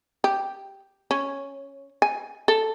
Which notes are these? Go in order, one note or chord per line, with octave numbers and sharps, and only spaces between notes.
G4
C#4
G#5
A4